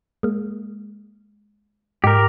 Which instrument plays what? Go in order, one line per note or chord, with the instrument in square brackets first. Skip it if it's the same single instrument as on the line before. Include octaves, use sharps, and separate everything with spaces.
[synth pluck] G#3 A#3
[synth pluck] G#2 [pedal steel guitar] G4 A#4